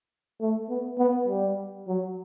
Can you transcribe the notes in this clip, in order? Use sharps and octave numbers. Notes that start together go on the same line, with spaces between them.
A3
B3
B3
G3
F#3